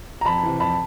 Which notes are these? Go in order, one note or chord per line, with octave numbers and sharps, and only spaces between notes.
A#5
F2 A5 B5
C3 E3
F2 A5 B5